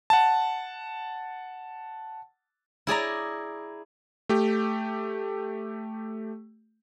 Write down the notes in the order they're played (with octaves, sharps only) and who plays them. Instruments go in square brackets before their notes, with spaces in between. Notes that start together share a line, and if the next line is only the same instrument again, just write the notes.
[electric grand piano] F#5 A5
[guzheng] E4 G#4 D5 A#5
[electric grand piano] A3 G4